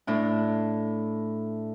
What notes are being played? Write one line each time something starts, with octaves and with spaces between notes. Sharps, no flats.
A2 D4